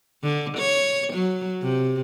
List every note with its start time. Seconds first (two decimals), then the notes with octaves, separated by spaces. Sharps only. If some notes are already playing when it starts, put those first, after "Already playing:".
0.23 D3
0.57 C#5
1.13 F#3
1.62 C3